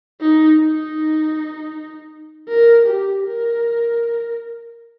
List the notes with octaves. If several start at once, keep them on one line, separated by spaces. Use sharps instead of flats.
D#4
D#4
A#4
G4
A#4